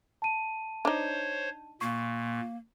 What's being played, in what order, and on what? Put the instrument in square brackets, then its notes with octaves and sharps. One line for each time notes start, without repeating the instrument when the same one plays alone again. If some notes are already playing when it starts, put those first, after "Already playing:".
[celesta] A5 D#7
[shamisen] D4 D#4 [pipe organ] C5 C#5
[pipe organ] A#2 [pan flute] A#3 [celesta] C#6